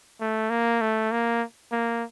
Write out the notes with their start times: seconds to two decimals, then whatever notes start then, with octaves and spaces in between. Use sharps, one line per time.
0.21 A3
0.50 A#3
0.81 A3
1.12 A#3
1.72 A#3